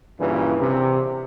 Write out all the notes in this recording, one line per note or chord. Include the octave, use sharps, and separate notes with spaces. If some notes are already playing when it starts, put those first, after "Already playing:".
G2 A#2 C#3 E3
C3